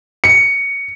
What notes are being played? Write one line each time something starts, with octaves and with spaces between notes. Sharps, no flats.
C#7